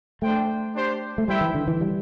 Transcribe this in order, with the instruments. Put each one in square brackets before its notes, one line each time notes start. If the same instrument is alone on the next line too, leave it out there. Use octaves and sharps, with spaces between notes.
[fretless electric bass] A3 [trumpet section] D4 C5 G5
[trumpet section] D4 G4 C5
[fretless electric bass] A3
[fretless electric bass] G3 [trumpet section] E4 C5 E5 G5
[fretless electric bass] E3
D3
E3
G3